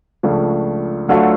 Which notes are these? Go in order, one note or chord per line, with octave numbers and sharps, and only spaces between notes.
C#2 C#3 F3 A3 D4
D2 D3 F#3 A3 F4